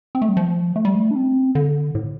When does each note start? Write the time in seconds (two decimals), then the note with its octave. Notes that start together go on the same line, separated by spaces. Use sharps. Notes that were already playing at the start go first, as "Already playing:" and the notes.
0.15 C4
0.22 A3
0.29 G3
0.37 F3
0.76 A3
0.85 G3
0.95 A3
1.11 D4
1.16 C4
1.55 D3
1.95 A2